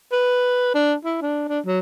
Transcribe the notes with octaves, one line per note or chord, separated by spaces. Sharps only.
B4
D4
E4
D4
D4
F#3